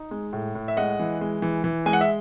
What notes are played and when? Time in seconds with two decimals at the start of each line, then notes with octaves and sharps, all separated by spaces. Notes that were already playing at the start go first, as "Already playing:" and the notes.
Already playing: D#4
0.11 G#3
0.33 A2
0.55 A2
0.68 E5
0.77 G#3 D#5 F#5
0.99 E3
1.21 G#3
1.42 E3
1.64 E3
1.86 G#3 G#5
1.93 F#5
2.01 E5